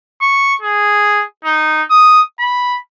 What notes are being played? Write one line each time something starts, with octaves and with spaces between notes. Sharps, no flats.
C#6
G#4
D#4
D#6
B5